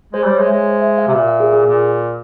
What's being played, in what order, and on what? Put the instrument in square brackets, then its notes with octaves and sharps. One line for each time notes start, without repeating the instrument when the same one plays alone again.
[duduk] G#3 [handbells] C5
[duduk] G3 [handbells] C#5
[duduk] G#3
[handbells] E5
[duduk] G#3
[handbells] C5
E5
F5
[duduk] C3
[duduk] A#2 [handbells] E5
[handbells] F5
G#4
G#4
[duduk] A#2